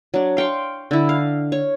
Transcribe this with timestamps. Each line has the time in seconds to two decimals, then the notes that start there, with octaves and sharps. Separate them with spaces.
0.14 F#3 D4
0.37 F5 G5 C6 C#6
0.91 D3 E4
1.09 F5
1.52 C#5